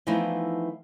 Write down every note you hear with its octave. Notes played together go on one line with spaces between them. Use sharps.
E3 F3 A3 B3 D#4 E4